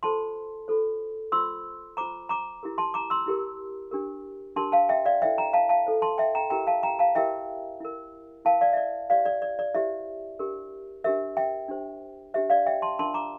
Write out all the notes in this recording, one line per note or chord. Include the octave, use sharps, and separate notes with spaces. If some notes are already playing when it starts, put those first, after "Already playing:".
F4 A4 C5 A5 C6
F4 A4 C5
F4 C5 C6 E6
F4 C5 A#5 D6
A#5 D6
E4 G4 A#4
A5 C6
A#5 D6
C6 E6
E4 G4 A#4
D4 G4 A#4
D4 G4 A#4 A5 C6
F5 A5
E5 G5
D5 F5
E4 A4 C5 E5 G5
G5 A#5
F5 A5
F5 A5
E4 A4 C5
A5 C6
E5 G5
G5 A#5
E4 G4 A#4 G5 A#5
F5 A5
G5 A#5
F5 A5
E4 G4 A#4 E5 G5
E4 A#4
E4 A#4 F5 A5
D5 F5
E5
D5
E4 G4 C5 D5 F5
D5
D5
D5
E4 G4 C5 E5
D4 G4 A#4
D4 G4 A#4 E5
E5 G5
D4 G4 C5
D4 G4 C5 E5
D5 F5
E5 G5
A5 C6
D4 F4 A#4 A5 C6
A#5 D6